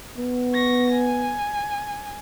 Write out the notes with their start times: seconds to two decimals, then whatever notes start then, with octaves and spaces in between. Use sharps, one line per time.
0.18 B3
0.53 C#6 A#6
0.92 G#5